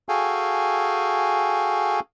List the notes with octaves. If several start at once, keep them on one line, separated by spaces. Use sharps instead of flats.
F#4 G#4 A4 F5 G5 G#5